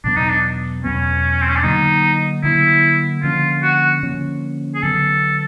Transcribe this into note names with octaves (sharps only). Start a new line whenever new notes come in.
E2 B2 F#3 B3 D4
D#4
D4
E2 B2 F#3 B3 C#4
C4
C#4
D4
D3 F#3 A#3 D#4
D3 F#3 A#3 E4
D3 F3 A#3 C#4 F4
F#4
D3 F3 A#3 C#4
G#4
D3 F#3 B3 A4